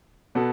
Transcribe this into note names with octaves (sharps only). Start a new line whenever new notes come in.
B2 B3 A4